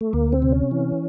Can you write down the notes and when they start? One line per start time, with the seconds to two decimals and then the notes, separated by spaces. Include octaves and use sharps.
0.01 A3
0.13 D2 A#3
0.33 C4
0.42 C3
0.52 C#4
0.71 E3